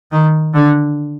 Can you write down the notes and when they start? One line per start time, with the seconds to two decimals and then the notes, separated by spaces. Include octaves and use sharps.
0.12 D#3
0.54 D3